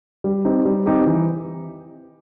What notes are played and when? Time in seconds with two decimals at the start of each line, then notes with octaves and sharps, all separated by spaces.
0.24 G3
0.45 C4 D#4 G4
0.65 G3
0.86 C4 D#4 G4
1.06 E3